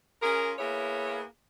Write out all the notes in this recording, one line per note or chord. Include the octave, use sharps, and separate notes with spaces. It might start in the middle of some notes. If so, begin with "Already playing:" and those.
C#4 F4 G#4 A#4
A#3 B3 E4 G#4 C#5